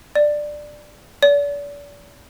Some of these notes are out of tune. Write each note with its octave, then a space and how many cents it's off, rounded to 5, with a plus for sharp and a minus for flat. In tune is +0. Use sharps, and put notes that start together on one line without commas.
D5 +10
D5 -35